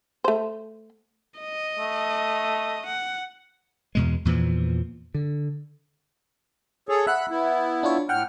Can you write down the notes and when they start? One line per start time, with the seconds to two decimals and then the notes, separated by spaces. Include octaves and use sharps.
0.24 A3 C5
1.40 D#5
1.78 A3
2.86 F#5
3.95 E2 B2 G#3
4.25 E2 A#2 E3 F3
5.14 D3
6.89 G#4 A4 C#5
7.07 E5 F#5 B5 F#6
7.30 B3 E4
7.83 D4 F4 C#5
8.09 A2 F#5 G5 F6